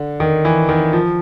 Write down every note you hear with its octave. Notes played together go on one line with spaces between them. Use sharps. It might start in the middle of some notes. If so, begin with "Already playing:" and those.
Already playing: D3
D#3
E3
D#3
F3